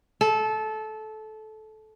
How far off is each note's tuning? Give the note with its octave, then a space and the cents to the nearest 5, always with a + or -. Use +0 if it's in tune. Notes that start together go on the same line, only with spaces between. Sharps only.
A4 -20